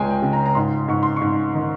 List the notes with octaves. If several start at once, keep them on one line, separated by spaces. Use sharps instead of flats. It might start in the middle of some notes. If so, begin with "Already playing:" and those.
Already playing: C#2 C#3 G#3 C#5 G5 G#5
G5
C#3
A#5
A#5
G#2 C6
G#2 C#6
C6
C#6
G#2
D#3